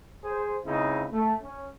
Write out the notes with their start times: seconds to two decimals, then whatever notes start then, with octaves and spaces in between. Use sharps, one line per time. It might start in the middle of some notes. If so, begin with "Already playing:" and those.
0.23 G#4 C5
0.64 C#2 C#3 C4 D#4 E4
1.12 A3
1.41 C#4